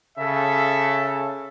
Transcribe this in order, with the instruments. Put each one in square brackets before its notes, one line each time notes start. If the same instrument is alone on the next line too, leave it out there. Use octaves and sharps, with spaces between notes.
[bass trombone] C#3 [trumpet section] A4 E5